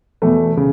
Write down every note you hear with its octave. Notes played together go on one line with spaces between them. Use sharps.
E2 B2 A3
C#3